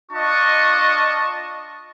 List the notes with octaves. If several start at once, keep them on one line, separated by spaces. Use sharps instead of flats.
D4 F4 D#5 A5 C#6